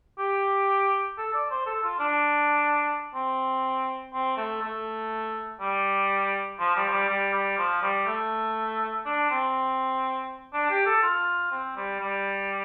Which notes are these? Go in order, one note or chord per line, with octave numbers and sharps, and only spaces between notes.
G4
A4
D5
C5
A4
F4
D4
C4
C4
A3
A3
G3
F3
G3
F3
G3
G3
G3
F3
G3
A3
D4
C4
D4
G4
A4
F4
C4
G3
G3